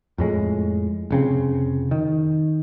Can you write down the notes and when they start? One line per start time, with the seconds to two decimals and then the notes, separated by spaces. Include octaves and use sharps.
0.18 F2 A2 G#3
1.10 F1 C#3 C4
1.91 D#3